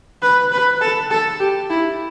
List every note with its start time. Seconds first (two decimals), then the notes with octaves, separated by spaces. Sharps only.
0.22 B4
0.52 B4
0.81 A4
1.11 A4
1.40 G4
1.70 E4